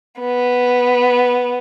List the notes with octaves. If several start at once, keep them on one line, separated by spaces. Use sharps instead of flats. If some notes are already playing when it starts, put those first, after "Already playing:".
B3